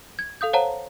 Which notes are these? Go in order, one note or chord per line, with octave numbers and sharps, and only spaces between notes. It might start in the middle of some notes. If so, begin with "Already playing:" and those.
G#6
A4 F5 D#6 G6
C5 C#5 F5 F#5 A5 A#5